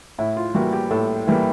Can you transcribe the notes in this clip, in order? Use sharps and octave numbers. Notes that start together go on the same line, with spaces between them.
A2 E4
F4
E3 G3 A#3 F#4
G4
A2 A4
E3 G3 A#3